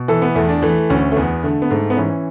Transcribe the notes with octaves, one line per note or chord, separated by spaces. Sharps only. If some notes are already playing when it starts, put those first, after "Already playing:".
Already playing: B2
E3 A4
B3
E2 A3
D4
E3 A3
D2 C#4
A3
E2 B3
D3 A3
B3
G#2 A3
B3
E3 C#4